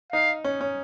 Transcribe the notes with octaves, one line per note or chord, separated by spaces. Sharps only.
D#4 F5
C#4
C#4